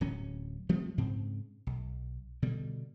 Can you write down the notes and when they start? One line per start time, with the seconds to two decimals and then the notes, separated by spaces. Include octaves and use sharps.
0.01 D1 F#3 C#4
0.69 F3 G3 A3 C4
0.98 G#2 C#3 C4
1.67 B1
2.42 B2 D3 G3